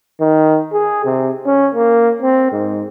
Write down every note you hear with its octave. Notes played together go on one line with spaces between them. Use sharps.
D#3
G#4
C3
C#4
A#3
C4
G#2